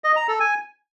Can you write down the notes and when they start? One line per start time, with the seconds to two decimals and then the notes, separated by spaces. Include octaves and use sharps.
0.04 D#5
0.16 A#5
0.28 A4
0.40 G#5